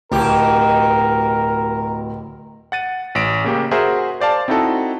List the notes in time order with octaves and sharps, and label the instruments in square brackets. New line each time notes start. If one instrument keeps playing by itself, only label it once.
[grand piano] D1 [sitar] B2 G4 [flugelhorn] A#4
[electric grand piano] F#5 A6 D#7
A1 D7
C#3 A#3 G4
F#4 G#4 A#4 C5 E5
C5 D5 F5 A5
C4 D#4 E4 F#4 A4 D#5